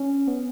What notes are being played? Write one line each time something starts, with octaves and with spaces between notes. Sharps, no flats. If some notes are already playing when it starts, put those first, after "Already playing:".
Already playing: C#4
B3